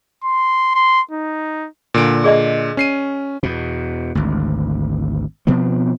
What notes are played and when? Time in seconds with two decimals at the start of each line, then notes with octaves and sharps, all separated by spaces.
0.24 C6
0.75 C6
1.11 D#4
1.94 A#2 D3 D7
2.24 G#4 D5 D#5
2.77 C#4 C7 D#7
3.43 E2 B2
4.15 G#1 D2
5.47 B2 F3 B3 C4